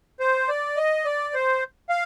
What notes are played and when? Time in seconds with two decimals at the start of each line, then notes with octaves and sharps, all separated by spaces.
0.20 C5
0.49 D5
0.77 D#5
1.05 D5
1.34 C5
1.90 F5